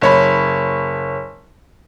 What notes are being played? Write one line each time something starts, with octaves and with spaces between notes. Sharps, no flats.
F#1 C#5 B5